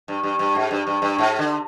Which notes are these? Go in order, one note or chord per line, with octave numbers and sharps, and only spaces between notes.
G2
G2
G2
G#2
G2
G2
G2
G#2
D3